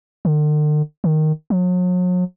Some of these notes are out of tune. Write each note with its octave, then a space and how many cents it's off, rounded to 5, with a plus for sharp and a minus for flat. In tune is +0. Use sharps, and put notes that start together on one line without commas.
D3 +45
D#3 -5
F#3 -40